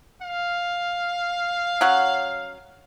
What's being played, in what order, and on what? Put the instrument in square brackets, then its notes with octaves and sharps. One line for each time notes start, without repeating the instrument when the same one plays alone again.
[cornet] F5
[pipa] F#3 C#4 F#5